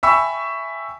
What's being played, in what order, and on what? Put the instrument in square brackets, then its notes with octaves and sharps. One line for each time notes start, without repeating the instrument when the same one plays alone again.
[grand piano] E5 G5 G#5 B5 C#6 E6